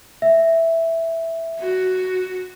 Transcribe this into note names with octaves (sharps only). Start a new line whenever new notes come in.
E5
F#4